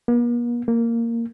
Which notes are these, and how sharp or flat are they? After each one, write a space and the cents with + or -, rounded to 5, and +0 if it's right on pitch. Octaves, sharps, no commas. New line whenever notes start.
A#3 +45
A#3 -10